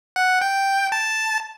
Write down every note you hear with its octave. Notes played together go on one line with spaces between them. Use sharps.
F#5
G5
A5